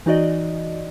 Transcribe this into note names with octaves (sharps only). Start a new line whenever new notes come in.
E3 D#4 F#4 D5 D#5